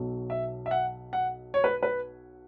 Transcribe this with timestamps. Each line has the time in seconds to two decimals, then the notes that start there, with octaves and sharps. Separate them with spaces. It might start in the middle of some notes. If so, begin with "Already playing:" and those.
Already playing: B1 B2 F#3
0.30 E5
0.66 E5
0.71 F#5
1.13 F#5
1.54 C#5
1.64 B4
1.83 B4